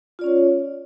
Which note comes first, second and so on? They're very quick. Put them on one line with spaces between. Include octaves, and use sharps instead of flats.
F4 D5 C#4 C#5